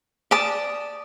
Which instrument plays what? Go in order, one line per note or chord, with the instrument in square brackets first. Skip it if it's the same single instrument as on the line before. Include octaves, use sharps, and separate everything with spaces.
[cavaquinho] D5 A5 D#6